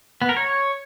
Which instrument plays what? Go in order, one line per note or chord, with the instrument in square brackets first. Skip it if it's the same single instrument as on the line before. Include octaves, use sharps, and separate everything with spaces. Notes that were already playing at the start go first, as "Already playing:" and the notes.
[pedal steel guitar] B3
A#4
C#5